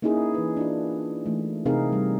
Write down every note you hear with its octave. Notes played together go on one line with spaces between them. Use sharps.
A#3 C#4 D#4 E4 G#4
E3 B4
D4 F4
E3 A3
C3 C4 D#4 G#4 A#4 F5
G3